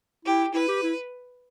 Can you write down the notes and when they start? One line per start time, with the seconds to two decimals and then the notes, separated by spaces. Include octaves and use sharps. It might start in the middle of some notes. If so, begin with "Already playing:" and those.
0.25 E4 G4
0.53 E4 B4
0.68 G4
0.83 E4